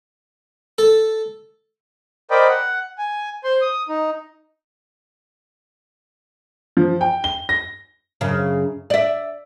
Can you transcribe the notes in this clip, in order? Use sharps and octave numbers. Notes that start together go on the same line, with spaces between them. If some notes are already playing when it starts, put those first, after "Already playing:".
A4
A#4 C5 D5 D#5 G5 B5
F#5
G#5
C5 C6
D#6
D#4
F3
G5
G7
A#6
F#2 C#3
D5 E5